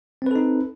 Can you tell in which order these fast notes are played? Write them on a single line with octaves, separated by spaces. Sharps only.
C4 B4 A4 D#4